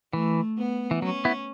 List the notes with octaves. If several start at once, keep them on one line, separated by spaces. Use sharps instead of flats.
E3 A3
B3
E3
F#3 C#4
B3 E4